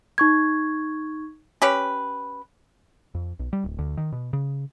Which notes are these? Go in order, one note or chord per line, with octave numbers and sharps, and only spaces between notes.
D#4 C#6 G#6
C#4 G4 B4
F2
B1
G3
D1
D2
D#3
B2
C#3